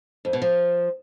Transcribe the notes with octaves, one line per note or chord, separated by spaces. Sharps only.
F2
B2
F3